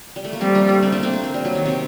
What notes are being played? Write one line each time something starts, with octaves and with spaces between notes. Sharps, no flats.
G3
A3
A#3
G3 A3 C4
A#3 D4
A3
A3 C4
A#3 D4
A3 C4
A#3
A#3
G3
F#3
D#3
C3